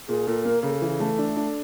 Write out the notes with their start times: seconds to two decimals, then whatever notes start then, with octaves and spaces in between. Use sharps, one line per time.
0.09 A#2 G#4
0.27 A#2 A4
0.45 A#3 A#4
0.63 C#3 A4
0.82 E3
1.00 A3
1.19 D4
1.37 D4